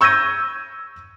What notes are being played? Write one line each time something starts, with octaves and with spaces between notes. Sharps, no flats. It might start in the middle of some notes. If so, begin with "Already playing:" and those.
C#6 E6 G6 G#6 A#6 D#7